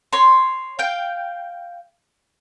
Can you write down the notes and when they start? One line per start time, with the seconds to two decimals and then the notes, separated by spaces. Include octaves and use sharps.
0.13 C#5 C6
0.79 F5 G5